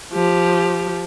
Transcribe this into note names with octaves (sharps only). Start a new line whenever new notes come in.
F3 G4